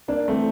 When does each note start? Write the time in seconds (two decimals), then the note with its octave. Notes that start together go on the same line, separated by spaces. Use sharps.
0.08 A#3 D4
0.28 E3 A3 C4